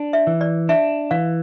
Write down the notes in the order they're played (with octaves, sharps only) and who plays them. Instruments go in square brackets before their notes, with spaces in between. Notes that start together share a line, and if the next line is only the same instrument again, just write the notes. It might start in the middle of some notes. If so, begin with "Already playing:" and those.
Already playing: [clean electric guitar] D4
[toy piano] E5
[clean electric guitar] E3
[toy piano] D5
[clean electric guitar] D4 [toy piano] E5
[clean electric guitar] E3 [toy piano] F5